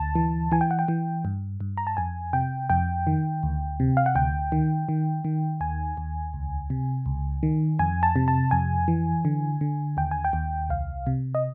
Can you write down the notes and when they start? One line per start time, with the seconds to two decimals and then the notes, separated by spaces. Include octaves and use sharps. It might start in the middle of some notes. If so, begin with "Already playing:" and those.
Already playing: D2 A5
0.16 E3
0.52 E3 G#5
0.61 G5
0.71 F#5
0.79 G5
0.88 E3
1.25 G2
1.61 G2
1.77 A#5
1.87 A5
1.97 F2 G#5
2.33 C3 G5
2.70 F2 G5
3.07 D#3
3.43 D2
3.80 C3
3.97 F5
4.06 F#5
4.15 D2 G5
4.52 D#3
4.89 D#3
5.25 D#3
5.61 D#2 G#5
5.97 D#2
6.34 C#2
6.70 C3
7.06 C#2
7.43 D#3
7.79 F2 G#5
8.03 A5
8.16 C3
8.28 A5
8.51 F2 G#5
8.88 E3
9.25 D3
9.61 D3
9.97 D#2 G5
10.11 G#5
10.25 G5
10.33 D#2
10.69 C2 F5
11.07 C3
11.35 D#5